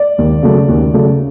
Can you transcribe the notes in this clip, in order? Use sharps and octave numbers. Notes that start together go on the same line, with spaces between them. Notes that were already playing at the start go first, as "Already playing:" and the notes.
Already playing: D5
D#2
C#3 F#3 A3
D#2
C#3 F#3 A3